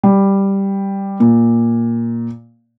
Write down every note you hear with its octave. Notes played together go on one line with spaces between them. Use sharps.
G3
A#2